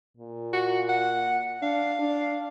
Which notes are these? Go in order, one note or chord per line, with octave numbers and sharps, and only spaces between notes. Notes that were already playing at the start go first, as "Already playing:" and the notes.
A#2
F#4
F#5
D4 F5
D4